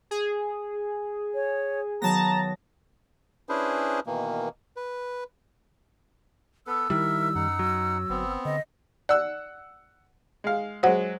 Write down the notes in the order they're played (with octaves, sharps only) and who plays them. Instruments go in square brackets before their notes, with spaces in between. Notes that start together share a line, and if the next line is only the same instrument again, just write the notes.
[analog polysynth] G#4
[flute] C#5
[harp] D#3 F#3 B3 [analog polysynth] A5 A#6 [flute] A#5
[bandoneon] C#4 D4 E4 G#4 B4 C5
B2 D#3 E3 A#3
B4
[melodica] B3 A4 B4 [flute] E6
[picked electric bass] D#3 G3 [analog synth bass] E4 [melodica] A#4 E5
[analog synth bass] F#2 [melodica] D#4 F#5
[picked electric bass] F#3
[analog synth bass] G1 [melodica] B3 C4
[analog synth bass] D3 [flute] D#5
[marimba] D5 [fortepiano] F#5 E6 F#6
[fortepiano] G#3 F5
[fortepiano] F#3 G#3 [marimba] C5 F#5